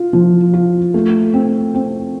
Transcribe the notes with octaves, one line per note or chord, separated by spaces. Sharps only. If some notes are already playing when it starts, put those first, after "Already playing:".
Already playing: F4
F3
F4
A3
C4
C4